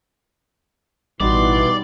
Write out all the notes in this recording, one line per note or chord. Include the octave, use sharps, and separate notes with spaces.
A1 B2 E3 G3 D#4 F#4 D5 C6